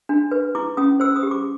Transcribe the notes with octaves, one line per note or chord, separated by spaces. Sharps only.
D4
B4
E4 D6
C#4 D#6
C5 E6
D#6
G4
D6